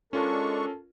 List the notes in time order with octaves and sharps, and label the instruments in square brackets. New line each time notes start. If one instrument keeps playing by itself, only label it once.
[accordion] G#3 D4 C#6 [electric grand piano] C#4 F4 A#4 [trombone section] A4